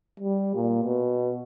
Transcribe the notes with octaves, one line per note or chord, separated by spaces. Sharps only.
G3
A#2
B2